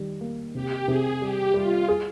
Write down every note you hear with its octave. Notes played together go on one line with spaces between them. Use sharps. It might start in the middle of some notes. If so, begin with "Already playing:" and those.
Already playing: D#3 G3
A#3
C3 G4
C3 G#4
G3 G4
G3 F4
G#4